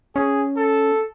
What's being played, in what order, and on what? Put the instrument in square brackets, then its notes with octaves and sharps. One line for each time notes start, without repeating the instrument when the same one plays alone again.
[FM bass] C#4 [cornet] G#4
[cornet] A4